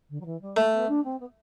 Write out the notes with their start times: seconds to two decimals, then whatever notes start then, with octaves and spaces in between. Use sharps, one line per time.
0.09 D3
0.20 F#3
0.25 E3
0.41 G3
0.57 A3
0.73 B3
0.88 D4
1.04 C4
1.20 B3